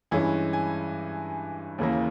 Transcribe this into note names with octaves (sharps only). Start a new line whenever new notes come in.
G2 E3 G#3 C#4 G#5
G#5
D#2 C#3 E3 A#3